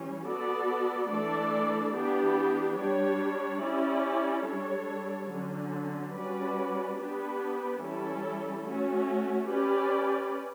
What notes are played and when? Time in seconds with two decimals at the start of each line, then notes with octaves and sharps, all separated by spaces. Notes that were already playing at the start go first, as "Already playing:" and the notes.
Already playing: E3 G3 C#4
0.25 B3 F#4 A4 D5
1.09 E3 A3 D4 A4 D5
1.93 E3 B3 D4 G4
2.78 G3 D4 G4 C#5
3.61 C#4 E4 G4 D5
4.45 G3 D4 A4 C#5
5.29 D3 F#3 C#4
6.14 G3 C#4 F#4 B4 D5
6.98 B3 D4 G4 B4
7.81 E3 G3 C#4 E4 A4
8.65 A3 C#4 F#4
9.49 C#4 G4 B4 D5